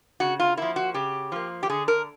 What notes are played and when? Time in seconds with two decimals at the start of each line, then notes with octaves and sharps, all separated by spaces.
0.20 C#3 F#4
0.40 F4
0.57 F3 A#3 E4
0.76 F#4
0.94 C#3 G4
1.32 F3 A#3
1.63 G4
1.70 D3 G#4
1.88 A#4